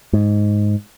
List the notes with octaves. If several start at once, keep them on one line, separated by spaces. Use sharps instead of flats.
G#2